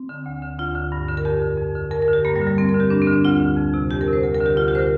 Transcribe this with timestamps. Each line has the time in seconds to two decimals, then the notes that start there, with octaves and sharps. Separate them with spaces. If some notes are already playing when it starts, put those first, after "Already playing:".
Already playing: C4
0.09 D3
0.26 D2
0.42 D3
0.59 D2 F4
0.75 D3
0.92 G2
1.08 D3
1.17 A#4
1.25 F2 G4
1.42 D3
1.58 F2
1.75 D3
1.91 F2 A#4
2.02 A#4
2.08 D3
2.13 G4
2.25 G2 A#3
2.36 G3
2.41 D3
2.47 G3
2.58 F2 C4
2.69 A#4
2.74 D3
2.80 G4
2.90 G2 D4
3.02 C4
3.07 D3
3.13 D4
3.25 D2 F4
3.40 D3
3.57 F2
3.74 C3
3.90 F2 G4
4.01 A#4
4.07 C3
4.13 C5
4.23 D2 A#4
4.34 A#4
4.40 D3
4.46 G4
4.56 D2 F4
4.68 G4
4.73 D3 C5
4.78 A#4